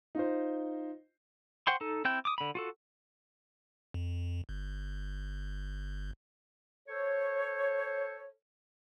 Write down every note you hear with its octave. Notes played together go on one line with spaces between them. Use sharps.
D#4 F4 C5
C5 F#5 G5 C6 C#6
D#4 A4
C4 E4 G5 G6
D6 D#6
D3 B5
F4 F#4 A4
F2
G1
A4 C5 C#5